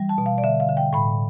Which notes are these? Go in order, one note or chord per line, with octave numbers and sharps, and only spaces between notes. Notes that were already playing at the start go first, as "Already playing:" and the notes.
Already playing: E3 G3
A5
B2
F5
D5
D3 E5
F5
D3
G5
A2 B5